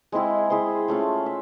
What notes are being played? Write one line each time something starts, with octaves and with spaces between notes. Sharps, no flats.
G#3 C4 E4 G#4
E4 G#4 C5
A3 C#4 F4
E5